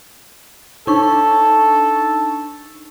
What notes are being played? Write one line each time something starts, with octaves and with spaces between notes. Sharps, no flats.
D4 D#4 A4 C#6